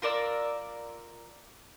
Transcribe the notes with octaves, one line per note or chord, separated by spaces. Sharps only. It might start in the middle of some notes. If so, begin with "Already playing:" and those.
F4 A#4 D5 E6